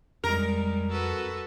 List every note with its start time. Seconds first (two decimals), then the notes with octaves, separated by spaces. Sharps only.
0.24 F2 G3 G#3 A#4
0.91 F#4 A4 B4